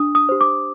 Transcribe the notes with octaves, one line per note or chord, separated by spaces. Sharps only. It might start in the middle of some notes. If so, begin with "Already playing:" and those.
Already playing: D4 D#6
D#6
G4 C5
D6